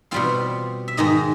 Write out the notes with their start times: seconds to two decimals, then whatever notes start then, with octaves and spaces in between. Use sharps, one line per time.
0.11 B2 G3 C4 F4 F5
0.88 E5
0.97 G#2 D#3 G#3 D#4 D#5